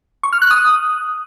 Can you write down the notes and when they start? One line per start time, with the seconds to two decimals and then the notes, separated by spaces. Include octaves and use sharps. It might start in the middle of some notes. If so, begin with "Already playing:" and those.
0.23 C#6
0.33 F6
0.42 F#6
0.51 D#6